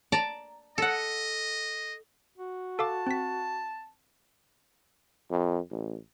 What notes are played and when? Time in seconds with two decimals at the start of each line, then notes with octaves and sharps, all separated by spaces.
0.12 D5 A5 A#5
0.78 A4 D#5 F#5
2.38 F#4
2.79 A4 F5 A5 D6
3.07 C4 B6
5.31 F2
5.70 A1